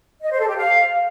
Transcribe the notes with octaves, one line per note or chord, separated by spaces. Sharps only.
D#5
C5
A4
G4
F5